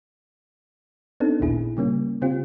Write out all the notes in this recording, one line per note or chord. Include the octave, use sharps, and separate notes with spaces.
B3 C4 D4 D#4 A4
A1 D#2 A#2 E4 G#4
C#3 G3 A#3 C#4
C#3 C4 F4 G4